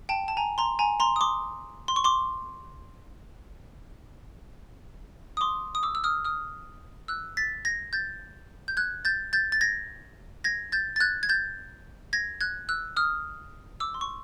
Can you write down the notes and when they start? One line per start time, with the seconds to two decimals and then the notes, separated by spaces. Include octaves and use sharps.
0.09 G5 A5
0.28 A5
0.37 G#5 A#5
0.58 A#5 C6
0.79 G#5 A#5
1.00 A#5 C6
1.16 D#6
1.21 C6 D6
1.88 C6
1.96 C#6
2.04 C6 D6
5.37 D#6
5.41 C6 D6
5.75 D#6
5.83 D6 E6
5.95 E6
6.04 D#6 F6
6.25 D#6 F6
7.08 E6 F#6
7.37 A6 B6
7.65 G#6 A#6
7.93 G6 A6
8.68 G6
8.77 F#6 G#6
9.05 G6 A6
9.33 G6 A6
9.52 A6
9.61 G#6 A#6
10.44 G#6 A#6
10.72 G6 A6
10.96 A6
11.00 F#6 G#6
11.23 G#6
11.29 G6 A6
12.13 G#6 A#6
12.41 F#6 G#6
12.69 E6 F#6
12.97 D#6 F6
13.80 D6 E6
13.94 C6
14.01 C#6